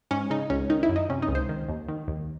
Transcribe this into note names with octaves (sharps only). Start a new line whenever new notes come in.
G#2 C#4
C#3 D#4
C#2 C#4
D#3 D#4
E4
F#2
D#4
C3 C#4
D#4
C#2
C5
D#3
D#2
D#3
D#2